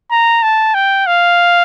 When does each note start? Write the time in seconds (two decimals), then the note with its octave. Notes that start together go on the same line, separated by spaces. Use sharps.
0.11 A#5
0.43 A5
0.74 G5
1.07 F5